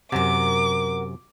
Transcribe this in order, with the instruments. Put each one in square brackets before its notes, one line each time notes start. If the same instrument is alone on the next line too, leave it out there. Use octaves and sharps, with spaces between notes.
[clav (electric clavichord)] F#2 C3 [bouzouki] F#4 A#4 [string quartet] D6